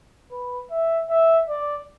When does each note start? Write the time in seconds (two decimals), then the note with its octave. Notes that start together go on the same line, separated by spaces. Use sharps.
0.31 B4
0.71 E5
1.10 E5
1.49 D5